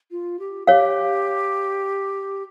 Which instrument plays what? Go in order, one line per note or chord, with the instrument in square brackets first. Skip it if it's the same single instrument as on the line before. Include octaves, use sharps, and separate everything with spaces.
[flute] F4
G4
[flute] G4 [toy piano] C#5 F5